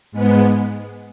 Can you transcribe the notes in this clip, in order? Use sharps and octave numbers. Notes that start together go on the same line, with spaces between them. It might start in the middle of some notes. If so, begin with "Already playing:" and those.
G#2 G#3 B3